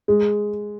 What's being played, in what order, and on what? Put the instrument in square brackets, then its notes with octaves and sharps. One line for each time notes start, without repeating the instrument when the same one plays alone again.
[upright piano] G#3